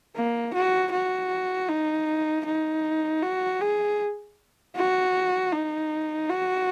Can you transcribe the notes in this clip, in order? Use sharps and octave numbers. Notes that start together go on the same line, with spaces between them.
A#3
F#4
F#4
D#4
D#4
F#4
G#4
F#4
D#4
F#4